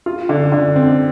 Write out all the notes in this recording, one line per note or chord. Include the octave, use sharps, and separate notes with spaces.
F4
D3
D3
C4